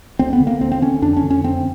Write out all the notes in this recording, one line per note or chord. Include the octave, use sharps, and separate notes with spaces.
D2 C4
B3
D3
A#3
D2 C4
C4
D3 C#4
F2 D4
C#4
D3
C#4
F2 C4